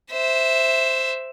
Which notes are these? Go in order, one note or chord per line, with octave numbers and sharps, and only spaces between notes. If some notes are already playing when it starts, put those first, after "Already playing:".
C5 E5